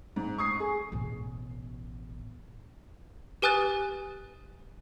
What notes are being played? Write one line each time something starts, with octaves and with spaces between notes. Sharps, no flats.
G#2
C#6 D#6 C7
G#4
A1 B2
G4 B4 G#5 D#6 F#6 A6